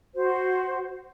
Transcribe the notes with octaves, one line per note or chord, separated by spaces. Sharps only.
F#4 C5